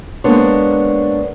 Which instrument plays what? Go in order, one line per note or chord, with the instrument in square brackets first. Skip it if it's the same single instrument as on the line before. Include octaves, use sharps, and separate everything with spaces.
[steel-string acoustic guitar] G#3 A#3 B3 D4 C5 C#5